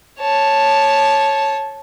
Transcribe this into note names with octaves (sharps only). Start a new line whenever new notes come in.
C#5 A5